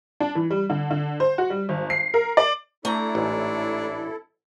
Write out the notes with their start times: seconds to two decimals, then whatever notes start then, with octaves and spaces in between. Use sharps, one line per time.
0.20 D4
0.35 E3
0.51 G3
0.70 D3
0.91 D3
1.20 C5
1.38 F#4
1.50 G3
1.69 G#1
1.90 C7
2.14 A#4
2.37 D5
2.85 A3 D4 E4 A4 A#5
3.15 A1 G#2